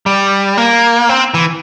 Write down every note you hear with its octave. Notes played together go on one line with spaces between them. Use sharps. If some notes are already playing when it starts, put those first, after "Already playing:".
G3
A#3
C4
E3